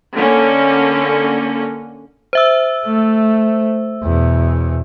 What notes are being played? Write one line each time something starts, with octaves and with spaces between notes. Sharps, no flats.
D3 A#3 C#4
C5 E5 E6
A3
E2 B2